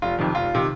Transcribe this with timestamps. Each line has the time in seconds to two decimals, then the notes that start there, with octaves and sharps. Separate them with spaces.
0.02 F1 F4
0.19 F2 C3 D#3
0.35 F1 F4
0.55 C3 D#3